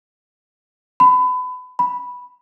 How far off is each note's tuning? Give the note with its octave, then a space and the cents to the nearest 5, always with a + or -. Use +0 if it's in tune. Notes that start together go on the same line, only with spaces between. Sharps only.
B5 +30
B5 -5